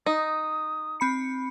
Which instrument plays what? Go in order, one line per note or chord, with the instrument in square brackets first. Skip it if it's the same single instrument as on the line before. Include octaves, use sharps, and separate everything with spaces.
[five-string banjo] D#4 [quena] D#6
[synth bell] C4 B5 C#7